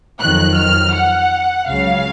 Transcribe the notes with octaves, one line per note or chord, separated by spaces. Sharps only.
F2 D#3 F#3 F#6
F6
F#5
C#2 C#3 F#3 F5